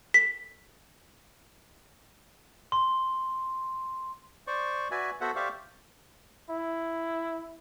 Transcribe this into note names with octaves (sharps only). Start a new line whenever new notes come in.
B6
C6
C5 D5 C#6
F#4 B4 D5 E5 G#5
B3 F#4 A4 C5 E5 F#5
G4 C5 D5 E5 F5 C#6
E4